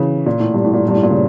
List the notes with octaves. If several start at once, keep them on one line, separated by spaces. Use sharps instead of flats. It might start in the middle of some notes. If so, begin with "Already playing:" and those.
Already playing: C#3 E3
A#2
A2
G2
A2
A#2
G2
A2
A#2
C#3